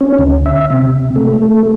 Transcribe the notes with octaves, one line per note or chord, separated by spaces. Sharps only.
C#4
D2
E5
C3
A3
A3